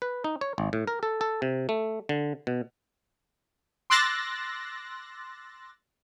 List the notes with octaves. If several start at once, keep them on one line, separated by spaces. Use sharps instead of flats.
B4
D#4
C#5
G#1
A2
A#4
A4
A4
C3
A3
D3
B2
C6 D6 E6 F#6 A6 A#6